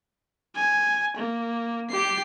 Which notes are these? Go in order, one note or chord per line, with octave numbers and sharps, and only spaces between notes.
G#5
A#3
G4 C7